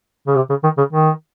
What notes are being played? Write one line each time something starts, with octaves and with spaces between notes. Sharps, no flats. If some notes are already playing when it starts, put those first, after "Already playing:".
C#3
C3
C#3
D#3
C#3
D#3